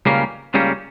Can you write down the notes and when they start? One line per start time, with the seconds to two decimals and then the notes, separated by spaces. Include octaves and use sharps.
0.06 C#2 C#3 G3 A#3 C#4
0.54 C#2 C#3 G3 A#3 C#4